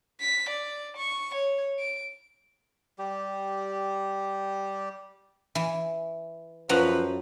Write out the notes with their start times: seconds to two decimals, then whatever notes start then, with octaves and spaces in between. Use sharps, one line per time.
0.20 B6
0.49 D5
0.97 C#6
1.34 C#5
1.79 D7
2.99 G3 G4
5.55 E3
6.69 F#2 F3 F#3 B4 A#5